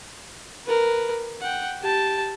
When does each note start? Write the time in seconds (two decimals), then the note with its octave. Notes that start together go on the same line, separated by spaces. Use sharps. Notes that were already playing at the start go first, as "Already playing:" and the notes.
0.66 A#4 B4
1.41 F#5 G5
1.81 G4 A5